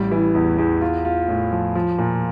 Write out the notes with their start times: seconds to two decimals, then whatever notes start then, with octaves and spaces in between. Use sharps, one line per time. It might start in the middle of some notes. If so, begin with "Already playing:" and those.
Already playing: A1 G3
0.11 E3
0.35 E2
0.58 E2
0.81 F4
1.05 F4
1.28 A2
1.52 F3
1.75 F3
1.98 A#2